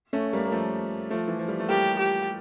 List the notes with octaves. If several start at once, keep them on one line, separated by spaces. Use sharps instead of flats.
A3 C#4
G3 A#3
A#3
F3 A3
F3 A3
E3
F3
G3
A3
G3 A#3 G4
G4